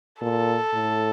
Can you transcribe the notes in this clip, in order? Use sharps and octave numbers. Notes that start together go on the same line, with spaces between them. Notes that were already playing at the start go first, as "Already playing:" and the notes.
A#2 A4
A2